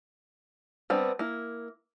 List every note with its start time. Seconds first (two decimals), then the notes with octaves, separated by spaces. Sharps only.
0.90 G3 B3 C4 D4
1.19 A#3 E4